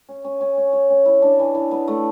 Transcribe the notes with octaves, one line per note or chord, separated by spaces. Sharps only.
C#4
C#4
C#4
C#4
C#5
C#4
E4
D4
E3
E3
B3
A3